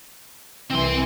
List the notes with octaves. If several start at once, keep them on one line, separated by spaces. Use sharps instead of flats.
C2 E3 C4 G#5 C6